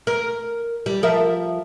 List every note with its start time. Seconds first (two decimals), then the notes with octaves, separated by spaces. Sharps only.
0.07 A#4
0.86 G3
1.03 F3 A#4 E5